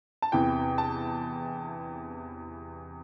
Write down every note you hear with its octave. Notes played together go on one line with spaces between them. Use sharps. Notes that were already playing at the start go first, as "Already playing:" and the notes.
A5
E2 C3 E3 G5
A5